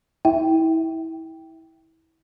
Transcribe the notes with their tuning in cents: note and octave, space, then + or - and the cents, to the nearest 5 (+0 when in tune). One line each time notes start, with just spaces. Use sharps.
E4 -25 E5 +0 G5 +0